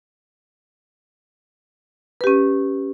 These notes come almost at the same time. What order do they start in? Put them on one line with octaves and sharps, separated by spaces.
B4 G4 C#4